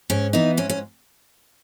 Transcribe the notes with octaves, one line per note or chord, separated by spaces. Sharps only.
G#2 C#4
E3 B3 D#4
G#2 C#4
C#4